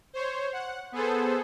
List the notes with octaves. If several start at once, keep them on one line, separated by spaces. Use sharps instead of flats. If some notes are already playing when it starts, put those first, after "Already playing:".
C5 C#5
F#5
B3 G#4 A4 C5